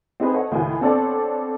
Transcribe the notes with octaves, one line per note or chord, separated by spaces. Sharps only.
C4 D#4 G#4 B4
A4 C5 C#5 D#5 F#5
C#2 A2 D#3 F4 F#4 G#5
B3 C4 D4 A4 C#5 D5